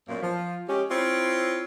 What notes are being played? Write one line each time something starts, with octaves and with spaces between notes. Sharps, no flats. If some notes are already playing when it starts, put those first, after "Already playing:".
F#2 A#2 A#3 B3
F3
G#3 C#4 G4
C4 E4 F4 C#5